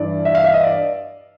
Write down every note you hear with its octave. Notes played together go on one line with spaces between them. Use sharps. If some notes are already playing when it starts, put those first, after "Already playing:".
Already playing: G2 E3 D5
E5
F5
E5
D#5
D5